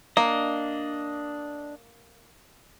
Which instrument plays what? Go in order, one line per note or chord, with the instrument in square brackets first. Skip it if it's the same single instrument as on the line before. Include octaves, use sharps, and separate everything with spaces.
[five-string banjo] A#3 [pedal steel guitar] D4 D#5